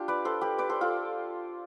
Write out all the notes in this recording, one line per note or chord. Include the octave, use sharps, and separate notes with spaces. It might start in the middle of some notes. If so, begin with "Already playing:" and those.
Already playing: D4 F4 G4
B4 D5
A4 C5
G4 B4
B4 D5
A4 C5
F4 A4